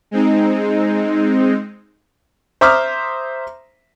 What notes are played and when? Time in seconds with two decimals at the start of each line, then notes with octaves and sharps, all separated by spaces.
0.11 G#3 C4 D#4
2.61 C5 E5 A#5 D6 D#6 F6